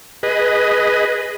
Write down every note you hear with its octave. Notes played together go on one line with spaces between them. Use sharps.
G#4 B4 D#5